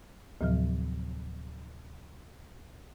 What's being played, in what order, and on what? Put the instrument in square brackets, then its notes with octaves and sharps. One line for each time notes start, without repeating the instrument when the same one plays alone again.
[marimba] D2 A2 C3 F3 F#3 F6